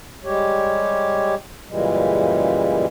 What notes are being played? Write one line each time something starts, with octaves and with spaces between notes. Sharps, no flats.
G3 G#3 G4 C#5
F#2 A#2 C#3 E3 G3 G#3